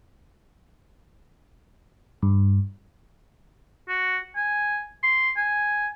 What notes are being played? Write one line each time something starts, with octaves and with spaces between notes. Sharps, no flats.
G2
F#4
G#5
C6
G#5